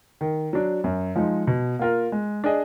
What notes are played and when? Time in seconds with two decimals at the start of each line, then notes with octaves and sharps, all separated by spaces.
0.21 D#3
0.53 F#3 D4
0.84 F#2
1.15 F3 G#3 D#4
1.47 B2
1.79 A#3 F4 A#4
2.12 G#3
2.44 D4 G#4 D#5